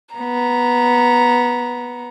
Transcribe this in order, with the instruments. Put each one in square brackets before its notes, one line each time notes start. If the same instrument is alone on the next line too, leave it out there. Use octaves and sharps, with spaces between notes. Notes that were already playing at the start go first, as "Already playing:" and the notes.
[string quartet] B3 A#5